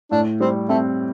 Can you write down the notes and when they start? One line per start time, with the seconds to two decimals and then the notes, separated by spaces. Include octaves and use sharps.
0.11 A2 D4
0.40 G3 C4
0.69 A3 C4